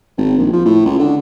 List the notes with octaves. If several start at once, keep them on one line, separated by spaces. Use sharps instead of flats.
G#1
A#1
F3
A2
C#2
D3